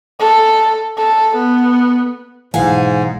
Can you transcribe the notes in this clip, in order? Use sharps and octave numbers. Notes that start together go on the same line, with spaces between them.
A4
A4
B3
B1 G#2 E3 F5 F#5 G#5